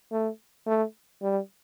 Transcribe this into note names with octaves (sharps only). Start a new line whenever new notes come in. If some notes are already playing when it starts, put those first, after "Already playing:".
A3
A3
G3